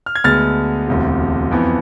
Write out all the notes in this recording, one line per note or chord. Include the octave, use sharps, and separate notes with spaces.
F6
G#6
D2 D3 G#3 B3 F6 A6
E1 D2 C3
F2 E3 B3